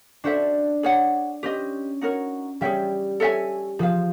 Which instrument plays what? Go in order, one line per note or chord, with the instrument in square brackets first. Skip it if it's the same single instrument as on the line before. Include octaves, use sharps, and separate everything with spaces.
[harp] D4 [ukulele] F#4 A4 C5 E5
[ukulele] G#4 C#5 F#5
[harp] C#4 [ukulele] G4 C5 D#5
[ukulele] D#4 F#4 A#4 C#5
[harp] G3 [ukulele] G#4 C#5 E5 G5
[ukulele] A4 C#5 E5 G#5
[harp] F3 [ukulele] G#4 C5 F5